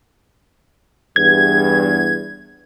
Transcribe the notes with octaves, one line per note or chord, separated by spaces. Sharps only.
E2 G2 G#6